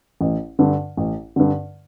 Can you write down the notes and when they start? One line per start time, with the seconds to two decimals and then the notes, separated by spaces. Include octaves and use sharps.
0.21 A1
0.59 G2 D3
0.97 A1
1.36 G2 D3